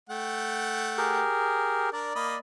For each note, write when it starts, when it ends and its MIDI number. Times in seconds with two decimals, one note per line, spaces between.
0.09 1.22 57
0.09 1.22 78
0.09 1.22 79
0.98 1.89 67
0.98 1.89 68
0.98 1.89 70
1.93 2.11 62
1.93 2.11 70
1.93 2.39 74
2.15 2.36 58
2.15 2.36 75
2.15 2.36 83